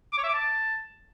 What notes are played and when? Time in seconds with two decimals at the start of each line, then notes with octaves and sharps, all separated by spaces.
0.13 D6
0.18 C#5
0.23 E5
0.28 D6
0.34 A5